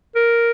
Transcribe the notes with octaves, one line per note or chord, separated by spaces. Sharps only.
A#4